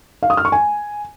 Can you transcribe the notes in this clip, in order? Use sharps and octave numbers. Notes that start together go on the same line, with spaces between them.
F5
D#6
F6
C#6
G#5